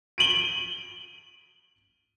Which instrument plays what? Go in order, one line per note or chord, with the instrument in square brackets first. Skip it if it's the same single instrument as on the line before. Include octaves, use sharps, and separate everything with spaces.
[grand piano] D7 D#7 F#7 G7